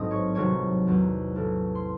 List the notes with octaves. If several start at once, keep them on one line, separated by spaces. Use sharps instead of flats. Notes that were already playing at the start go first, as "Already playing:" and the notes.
Already playing: A1 G#2 F#3 C4 D#5 D#6
C#5 C#6
C2 C3 D#3 F#3 C#5 C#6
E2 D#3 F#3 C4
A1 A2 E3 A3
C6